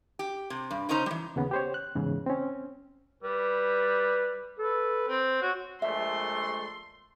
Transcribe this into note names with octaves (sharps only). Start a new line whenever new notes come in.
G4
C3
G2
C#3 C#4 D#4 C5 A#5
E3 G3
D#2 C#3 B3
G4 C5 C#5
F#6
E2 G#2 C#3 E3
C4 C#4
G3 B4
A4 B4
C4
F#4 C#5
A#1 G#3 A3 E5 C6